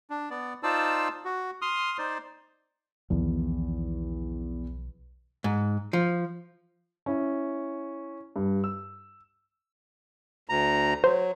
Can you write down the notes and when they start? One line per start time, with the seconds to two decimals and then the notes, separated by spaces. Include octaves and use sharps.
0.10 D4
0.30 B3 D5
0.63 D#4 F4 C5 D5 A5 E6
1.25 F#4
1.62 C6 D#6 F6
1.98 D#4 C5 D5
3.10 B1 E2 D#3 F3
5.44 G#2
5.93 F3
7.06 C#4 E4
8.36 G2
8.64 E6
10.49 D2 A#5
11.04 F#3 C5